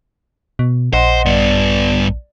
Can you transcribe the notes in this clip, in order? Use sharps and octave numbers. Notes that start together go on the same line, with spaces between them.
B2
A#1 C5 D#5 F#5 C6
G2 B3 D5